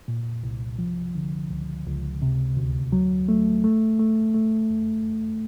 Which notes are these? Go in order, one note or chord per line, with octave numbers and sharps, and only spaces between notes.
A#2
C2
F3
D3
C#2
C#2
C3
D2
F#3
A3
A3
A3
A3
E2